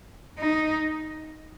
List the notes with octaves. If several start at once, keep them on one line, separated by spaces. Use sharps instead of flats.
D#4